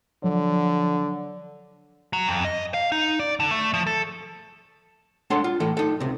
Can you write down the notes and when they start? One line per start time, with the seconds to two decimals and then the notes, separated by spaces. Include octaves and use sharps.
0.23 D3 F3 F#3 C#5
2.13 F#3
2.28 F2
2.45 D#5
2.74 F5
2.92 D#4
3.19 D5
3.40 D3
3.51 A3
3.74 F3
3.87 A4
5.30 G#3 D4 A4 C#5 F#5 C6
5.44 F4
5.60 A2 E3 A4
5.77 D#4 A4
6.00 C#2 C3